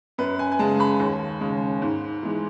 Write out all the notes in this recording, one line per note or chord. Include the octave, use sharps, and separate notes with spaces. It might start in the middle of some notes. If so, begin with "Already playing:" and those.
F#2 B4
G#5
G#5
C#3 G#3 A5
B5
D#2
C#3 G#3
G#2
E3 G#3